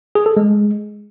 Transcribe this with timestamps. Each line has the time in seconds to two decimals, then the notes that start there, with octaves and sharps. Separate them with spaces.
0.15 G#4
0.26 A4
0.37 G#3